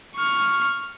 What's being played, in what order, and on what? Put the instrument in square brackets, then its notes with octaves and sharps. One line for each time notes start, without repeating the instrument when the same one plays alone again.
[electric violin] C#6 F6